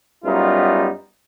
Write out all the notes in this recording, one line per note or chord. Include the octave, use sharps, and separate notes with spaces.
F#2 G3 B3 D#4 F4